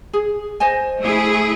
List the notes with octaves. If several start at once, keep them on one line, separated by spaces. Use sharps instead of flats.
G#4
C5 D#5 G#5
A3 E4 G#4